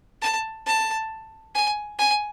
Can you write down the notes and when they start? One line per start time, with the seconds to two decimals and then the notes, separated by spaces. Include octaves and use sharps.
0.22 A5
0.66 A5
1.55 G#5
1.99 G#5